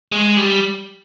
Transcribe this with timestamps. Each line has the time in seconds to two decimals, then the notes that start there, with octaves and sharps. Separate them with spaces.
0.12 G#3
0.37 G3